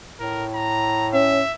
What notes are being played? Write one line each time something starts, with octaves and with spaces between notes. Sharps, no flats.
A2 A#4
A#5
C#4 E5